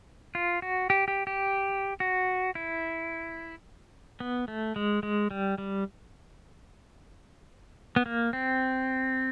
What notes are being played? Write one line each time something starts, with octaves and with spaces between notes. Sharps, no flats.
F4
F#4
G4
G4
G4
F#4
E4
B3
A3
G#3
G#3
G3
G3
B3
A#3
C4